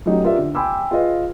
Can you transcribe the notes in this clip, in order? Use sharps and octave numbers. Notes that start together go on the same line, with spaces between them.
F#3 A3 C#4 D#4 G4
F4 G4 A#4 D5 E5
D3
G5 G#5 B5 C6 D6 E6
F4 G#4 B4 D#5 F5